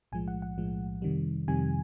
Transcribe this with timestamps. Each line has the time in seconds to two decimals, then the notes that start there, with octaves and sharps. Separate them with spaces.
0.12 B1 A2 F3 G#3 G#5
0.28 F#5
0.42 F#5
0.58 B1 A2 F3 G#3
1.02 F2 C3 D#3 G3
1.48 F2 C3 D#3 G3 G#5